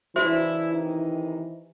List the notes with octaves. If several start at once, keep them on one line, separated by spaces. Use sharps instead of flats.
C#3 E3 D4 E4 F#4 C5 E5
C3 D#3 D#4